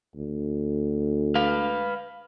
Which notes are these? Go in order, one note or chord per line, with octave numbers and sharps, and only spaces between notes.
D2
B4 F5